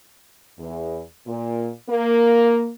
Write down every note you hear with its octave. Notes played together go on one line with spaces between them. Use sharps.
E2
A#2
A#3